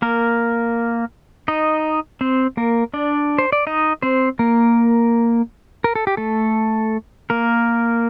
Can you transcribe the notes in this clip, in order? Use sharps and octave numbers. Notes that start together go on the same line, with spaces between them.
A#3 A#4
D#4 D#5
C4 C5
A#3 A#4
D4 D5
C5
D5
D#4 D#5
C4 C5
A#3 A#4
A#4
A4
G4
A3 A4
A#3 A#4